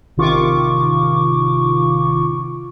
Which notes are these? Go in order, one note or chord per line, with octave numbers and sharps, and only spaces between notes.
A1 C3 D#3 F4 C#6 D6